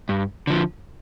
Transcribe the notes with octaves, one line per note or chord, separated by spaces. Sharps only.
G2
D3 F3